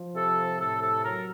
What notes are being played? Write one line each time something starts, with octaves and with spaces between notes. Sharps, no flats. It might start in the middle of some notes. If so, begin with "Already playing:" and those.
Already playing: F3
C3 A4
A2 A4
A4
F#3 A#4